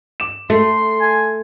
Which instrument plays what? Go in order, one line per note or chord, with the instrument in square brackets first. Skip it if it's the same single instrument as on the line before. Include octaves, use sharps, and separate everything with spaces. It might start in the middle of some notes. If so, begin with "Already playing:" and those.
[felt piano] D6 E7
[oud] A3 [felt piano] A4 [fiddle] C6
[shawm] G#5